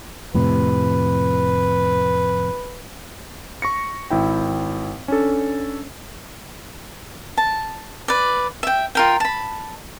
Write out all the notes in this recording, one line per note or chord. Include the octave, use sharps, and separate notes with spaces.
F2 A2 C3 B4
C#6 A#6 C#7
G#1 E4 G5
C#4 D4 A4
A5
B4 D5
E5 G5
F4 A#4 G5
A5 B5